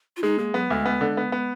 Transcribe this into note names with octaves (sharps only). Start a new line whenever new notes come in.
F4
G#3 D#4
G#3 A#3
F#3 B3
D2 G#3
B3
D3
B3
B3